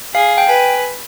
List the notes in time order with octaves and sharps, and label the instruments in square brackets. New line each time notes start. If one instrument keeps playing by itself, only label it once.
[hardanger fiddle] G#4 [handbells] F5
[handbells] G5
[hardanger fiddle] B4 [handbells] G#5